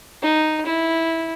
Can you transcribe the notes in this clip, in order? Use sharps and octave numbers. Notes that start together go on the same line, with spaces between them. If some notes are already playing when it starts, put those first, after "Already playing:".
D#4
E4